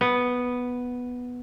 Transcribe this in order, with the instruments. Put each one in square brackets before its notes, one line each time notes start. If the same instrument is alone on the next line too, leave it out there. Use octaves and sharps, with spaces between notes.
[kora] B3